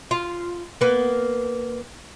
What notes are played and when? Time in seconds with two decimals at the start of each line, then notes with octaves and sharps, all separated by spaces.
0.11 F4
0.81 A#3 B3